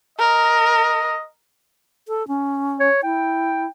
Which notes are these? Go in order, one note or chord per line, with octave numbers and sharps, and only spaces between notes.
A#4 D#5
A4
C#4
C#5
E4 G5